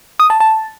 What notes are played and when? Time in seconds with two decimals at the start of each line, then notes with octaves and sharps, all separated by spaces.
0.20 D#6
0.30 A5
0.40 A5